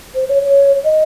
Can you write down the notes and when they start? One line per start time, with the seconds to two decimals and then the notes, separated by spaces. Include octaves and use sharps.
0.15 C5
0.29 C#5
0.43 C#5
0.85 D#5